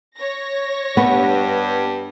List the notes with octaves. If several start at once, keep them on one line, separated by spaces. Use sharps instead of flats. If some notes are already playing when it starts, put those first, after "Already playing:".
C#5 A#6
G2 B3